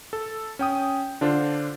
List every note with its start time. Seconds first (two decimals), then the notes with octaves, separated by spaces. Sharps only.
0.13 A4
0.59 C#4 G5 D#6
1.21 D3 D4 F4 C5